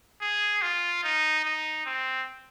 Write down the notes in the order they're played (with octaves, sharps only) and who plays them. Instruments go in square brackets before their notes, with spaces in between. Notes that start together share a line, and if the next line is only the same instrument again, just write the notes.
[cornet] G#4
F4
D#4
D#4
C4